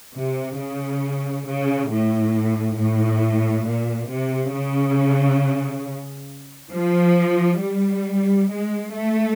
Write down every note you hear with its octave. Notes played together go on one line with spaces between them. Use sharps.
C3
C#3
C#3
A2
A2
A#2
C3
C#3
F3
G3
G#3
A3